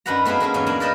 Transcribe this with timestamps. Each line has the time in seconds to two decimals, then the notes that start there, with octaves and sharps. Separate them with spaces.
0.06 F#2 D4 D#4 B4 F#5 A#5
0.25 A3 B3 C4 G#4 F5
0.40 G#3 A#3 B3 C#4
0.54 E2 G#2 F#3 C#4
0.66 A#3 C#4 D4 G#5
0.80 A#4 B4 D5 D#5 G5 A5